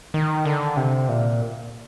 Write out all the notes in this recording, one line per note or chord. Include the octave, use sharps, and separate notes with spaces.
D#3
D3
C3
A#2